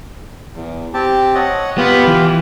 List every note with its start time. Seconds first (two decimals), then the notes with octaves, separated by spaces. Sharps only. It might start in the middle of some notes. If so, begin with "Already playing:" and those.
0.55 E2
0.94 C4 G4 A5
1.35 C#5 D#5 F#5
1.78 B3 F4 G4 B4
2.07 E3